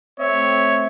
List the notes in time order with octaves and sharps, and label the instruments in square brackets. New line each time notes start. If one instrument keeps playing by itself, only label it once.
[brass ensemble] A3 C4 E5 [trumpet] C#5